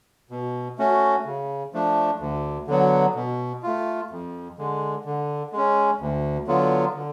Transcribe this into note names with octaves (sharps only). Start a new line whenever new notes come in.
B2
A3 C#4 F#4
C#3
F3 A3 D4
D2
D3 F#3 B3
B2
A3 F4
F2
D3 G#3
D3
G#3 C#4
D2
D3 F#3 B3 F4
D3